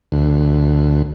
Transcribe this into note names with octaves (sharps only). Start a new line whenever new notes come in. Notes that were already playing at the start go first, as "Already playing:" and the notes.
D2